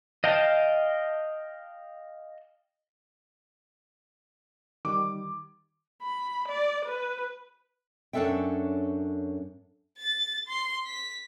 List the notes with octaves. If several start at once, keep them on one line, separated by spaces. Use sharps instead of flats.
D#5 F5 G5 A5
D#3 G3 D6
B5
D5
B4
F#2 C#4 D4 A4 E5 G5
A6
C6
B6